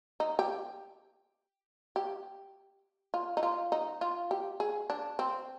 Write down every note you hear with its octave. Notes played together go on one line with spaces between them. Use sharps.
D#4
G4
G4
F4
D#4
F4
D#4
F4
G4
G#4
D4
C4